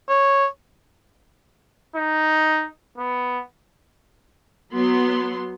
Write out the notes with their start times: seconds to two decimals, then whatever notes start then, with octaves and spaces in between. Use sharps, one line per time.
0.09 C#5
1.96 D#4
2.98 B3
4.72 F#3 B3 C6